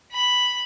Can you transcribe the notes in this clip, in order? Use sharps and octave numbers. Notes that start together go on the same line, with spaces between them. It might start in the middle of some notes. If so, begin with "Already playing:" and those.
B5